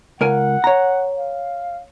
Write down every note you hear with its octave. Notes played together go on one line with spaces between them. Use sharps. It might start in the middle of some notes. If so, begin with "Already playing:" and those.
C#2 A#4 F#5 G#5
C#5 A#5
F5